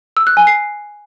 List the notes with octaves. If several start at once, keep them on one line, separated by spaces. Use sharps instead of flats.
E6
F#6
G#5
C7